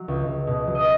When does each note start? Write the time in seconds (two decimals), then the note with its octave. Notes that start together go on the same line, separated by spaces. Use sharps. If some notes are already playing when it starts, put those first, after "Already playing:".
Already playing: F#3
0.08 C#2
0.27 C#2
0.47 B2
0.67 F#3
0.75 D#5